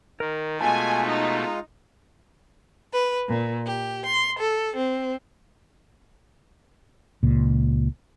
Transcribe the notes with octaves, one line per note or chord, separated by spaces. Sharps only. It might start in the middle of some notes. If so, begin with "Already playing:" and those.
D#3 A#4
B2 G#3 A3 F4 G#5 A5
D#4
B4
A#2
G4
C6
A4
C4
C#2 A#2